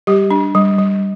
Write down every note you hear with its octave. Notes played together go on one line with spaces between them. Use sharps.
G3 G4
D4
G3
G3